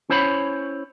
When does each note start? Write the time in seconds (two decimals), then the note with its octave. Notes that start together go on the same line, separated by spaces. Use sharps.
0.10 C#4 E4 C5 C#5 A#5 B5